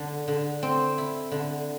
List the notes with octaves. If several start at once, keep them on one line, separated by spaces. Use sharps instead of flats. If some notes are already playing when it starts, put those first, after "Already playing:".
Already playing: D3 D4
D3
C4
E4
D3